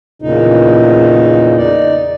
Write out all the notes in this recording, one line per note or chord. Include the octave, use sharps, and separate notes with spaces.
E2 A#2 C#3 D#4
D#4 D5